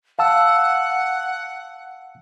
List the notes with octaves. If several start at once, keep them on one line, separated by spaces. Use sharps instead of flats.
F5 F#5 A5 E6